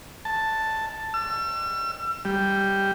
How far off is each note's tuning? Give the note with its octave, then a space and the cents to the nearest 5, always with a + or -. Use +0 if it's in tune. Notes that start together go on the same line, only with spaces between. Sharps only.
A5 +5
E6 +40
G3 +0